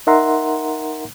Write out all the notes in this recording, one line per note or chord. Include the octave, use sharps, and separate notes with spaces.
D#4 A#4 E5 F#5 A#5 C6